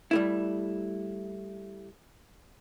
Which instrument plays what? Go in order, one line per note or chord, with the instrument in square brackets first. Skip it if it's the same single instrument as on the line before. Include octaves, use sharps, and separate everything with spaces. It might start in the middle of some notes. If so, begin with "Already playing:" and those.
[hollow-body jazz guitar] G3 A3 E4